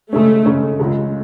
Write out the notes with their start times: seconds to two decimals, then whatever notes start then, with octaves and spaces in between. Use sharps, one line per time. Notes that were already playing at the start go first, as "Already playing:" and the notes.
0.13 C#3 G#3 A3 C#4
0.46 C#3 G#3 C#4
0.79 C#2 C#3 G#3